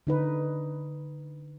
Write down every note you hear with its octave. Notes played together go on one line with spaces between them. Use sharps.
D3 D#4 B4